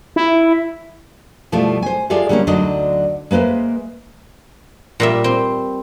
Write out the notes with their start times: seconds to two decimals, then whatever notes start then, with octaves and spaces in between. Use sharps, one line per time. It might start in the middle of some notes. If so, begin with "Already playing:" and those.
0.16 E4
1.52 B2 F3 G3 A3 E4 F4
1.82 C5 G#5
2.10 G#3 F4 G4 A4 D5 E5
2.29 D3 G3 A#3 C4 C#4
2.47 D2 D3 F#3 D4 D#4 D#5
3.31 G#3 A#3 B4 C5 E5
5.00 A#2 G3 E5
5.24 C4